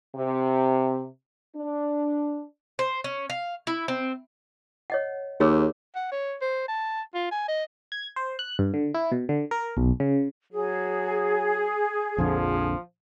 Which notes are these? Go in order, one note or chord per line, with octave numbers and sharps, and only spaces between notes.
C3
D4
C5
C#4
F5
E4
C4
C#5 D#5 F#5
D#2 G#4 C#5 E6
F#5
C#5
C5
A5
F4
G#5
D#5
G#6
C5
F#6
G2
D3
E4
B2
D3
A#4
B1
C#3
F#3 G#4
A#1 F2 D3 F3